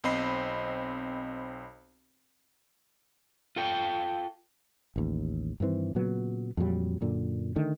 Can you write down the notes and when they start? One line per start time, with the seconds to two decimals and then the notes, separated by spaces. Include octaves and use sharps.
0.04 B1 C4 C5 D#5 B5 C7
3.56 F4 A4 G5
4.96 A1 D#2
5.60 G2 D#3 E3 C4
5.95 A#2 C#3 F#3 B3
6.57 F2 A#2 F#3 G3
7.01 F#2 A#2 D3
7.56 D3 D#3 A3